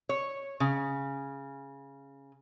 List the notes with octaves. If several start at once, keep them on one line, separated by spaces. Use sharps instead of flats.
C#5
C#3